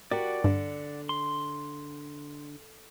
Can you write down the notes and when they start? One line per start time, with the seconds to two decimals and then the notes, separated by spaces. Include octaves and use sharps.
0.11 F#4 G4 A#4 D5 F#5
0.44 G2 D3
1.09 C6